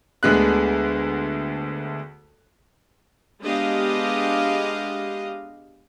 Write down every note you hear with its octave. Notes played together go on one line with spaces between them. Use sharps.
D2 D3 G#3 B3 F#6
G#3 B3 D4 G4 D#5 F5